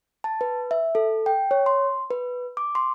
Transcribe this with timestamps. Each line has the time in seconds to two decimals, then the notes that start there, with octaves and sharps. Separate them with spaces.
0.24 A5
0.41 B4
0.71 E5
0.95 A4
1.26 G5
1.51 C#5
1.66 C6
2.11 B4
2.57 D6
2.75 C6